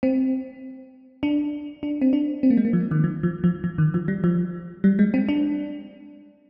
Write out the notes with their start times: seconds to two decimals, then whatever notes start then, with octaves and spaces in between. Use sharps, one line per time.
0.03 C4
1.23 D4
1.83 D4
2.02 C4
2.13 D4
2.43 C4
2.50 A#3
2.57 G#3
2.65 A#3
2.73 F3
2.91 D#3
3.04 F3
3.23 F3
3.44 F3
3.64 F3
3.78 D#3
3.94 F3
4.08 G3
4.24 F3
4.84 G3
4.99 G#3
5.14 C4
5.29 D4